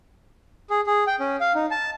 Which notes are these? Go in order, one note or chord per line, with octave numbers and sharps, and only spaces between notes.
G#4
G#4
G5
C#4
F5
D#4
A5